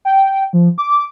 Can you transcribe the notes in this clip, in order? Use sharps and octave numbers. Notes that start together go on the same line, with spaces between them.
G5
F3
D6